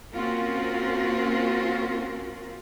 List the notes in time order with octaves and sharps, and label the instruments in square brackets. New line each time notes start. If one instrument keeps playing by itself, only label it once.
[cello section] A#3 C4 C#4 F4 F#4 A#4